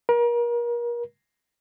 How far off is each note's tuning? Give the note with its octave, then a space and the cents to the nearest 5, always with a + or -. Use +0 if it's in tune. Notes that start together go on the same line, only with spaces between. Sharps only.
A#4 +35